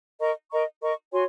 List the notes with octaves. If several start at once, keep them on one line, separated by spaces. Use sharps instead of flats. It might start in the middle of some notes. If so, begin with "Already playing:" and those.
A#4 D#5 A#5 C#6
A#4 D#5 A#5 C#6
A#4 D#5 A#5 C#6
F#4 C#5 G#5 C6